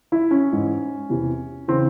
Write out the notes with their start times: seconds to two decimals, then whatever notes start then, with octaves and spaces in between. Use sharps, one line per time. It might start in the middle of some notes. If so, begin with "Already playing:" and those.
0.12 E4
0.31 C#4
0.51 G#2 E3
1.09 E2 C3 E3
1.68 C#3 E3 C4